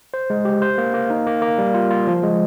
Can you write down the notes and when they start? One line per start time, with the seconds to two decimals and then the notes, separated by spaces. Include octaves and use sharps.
0.14 C5
0.30 G#3
0.45 G4
0.62 C5
0.78 A#3
0.94 A#3
1.10 D#4
1.27 A#3
1.42 A#3
1.58 G3
1.74 F4
1.91 F4
2.07 F3
2.23 G#3